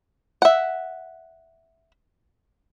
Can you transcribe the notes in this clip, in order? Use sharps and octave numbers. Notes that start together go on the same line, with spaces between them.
E5 F#5